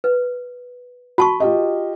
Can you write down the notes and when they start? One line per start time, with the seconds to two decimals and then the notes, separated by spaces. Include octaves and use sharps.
0.04 B4
1.18 F#4 A5 B5 C#6
1.40 F4 G4 D#5